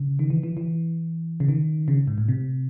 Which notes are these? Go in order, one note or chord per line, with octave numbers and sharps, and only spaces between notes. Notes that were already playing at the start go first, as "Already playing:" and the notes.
Already playing: C#3
D#3
E3
E3
E3
C#3
D#3
C#3
G#2
A2
C3